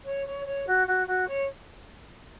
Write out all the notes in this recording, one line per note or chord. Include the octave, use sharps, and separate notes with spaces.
C#5
C#5
C#5
F#4
F#4
F#4
C#5